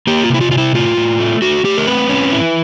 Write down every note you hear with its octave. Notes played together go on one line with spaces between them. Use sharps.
A#3 G4
F4
C3 E4
F4
C3 F4
E4
A2 F4
A2
A3
A3 F#4
A3 G4
A#4
C4 B4
C#4
E4